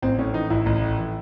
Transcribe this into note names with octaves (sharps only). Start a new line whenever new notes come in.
A1 C4
A2 C#4
E3 D#4
A1 E4
A1
A2
E3